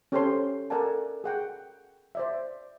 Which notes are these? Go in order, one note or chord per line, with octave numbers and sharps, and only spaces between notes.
C#4 G4 A4 C5 C#5 C6
A4 A#4 D5 F#5 G#5 A5
G#4 F#5 G5
C5 D5 E5